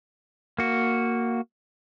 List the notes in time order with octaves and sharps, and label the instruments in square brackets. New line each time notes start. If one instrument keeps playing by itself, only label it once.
[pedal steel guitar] A#3 F#4